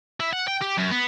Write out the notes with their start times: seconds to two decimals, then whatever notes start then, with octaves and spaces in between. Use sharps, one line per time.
0.20 E4
0.33 F#5
0.48 G5
0.62 G4
0.78 F#2
0.91 B3